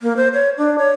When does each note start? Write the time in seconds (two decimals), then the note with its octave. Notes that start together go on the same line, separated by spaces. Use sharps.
0.01 A#3
0.17 C5
0.34 C#5
0.58 D4
0.78 C#5